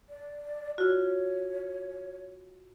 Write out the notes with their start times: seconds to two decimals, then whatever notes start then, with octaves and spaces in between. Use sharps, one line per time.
0.09 D5
0.78 F4 F#4 C#5